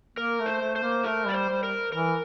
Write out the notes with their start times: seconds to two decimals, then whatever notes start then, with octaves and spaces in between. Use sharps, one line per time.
0.17 A#3 A#4
0.39 A3
0.46 C5
0.61 A3
0.76 C5
0.82 A#3
1.04 A3 A#4
1.26 G3 D5
1.34 C5
1.49 G3
1.63 A#4
1.92 E3 A#4